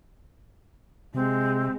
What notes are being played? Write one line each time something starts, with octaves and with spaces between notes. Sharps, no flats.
C3 G#3 C4